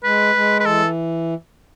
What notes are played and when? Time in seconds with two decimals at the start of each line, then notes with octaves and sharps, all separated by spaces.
0.04 G#3 B4
0.35 G#3
0.60 B4
0.65 E3 A4